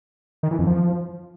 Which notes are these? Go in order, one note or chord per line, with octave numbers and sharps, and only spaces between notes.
D#3
E3
F2
F3